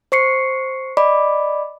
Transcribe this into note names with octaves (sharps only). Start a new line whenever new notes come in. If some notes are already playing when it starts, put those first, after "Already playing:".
C5 C#6 C7 C#7
D5 D#5 B5 D6